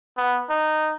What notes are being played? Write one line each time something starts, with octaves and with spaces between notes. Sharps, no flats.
B3
D#4